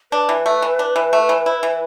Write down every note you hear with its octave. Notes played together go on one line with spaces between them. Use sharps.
D4 B4
E3
A3
E3
D4
E3
A3
E3
E4
E3